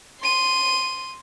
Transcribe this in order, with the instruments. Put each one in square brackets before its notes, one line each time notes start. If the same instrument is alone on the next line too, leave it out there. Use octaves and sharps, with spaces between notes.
[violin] C6 D#7